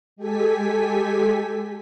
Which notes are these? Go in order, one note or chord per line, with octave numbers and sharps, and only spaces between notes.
G#3 G4 A4 G#5 B6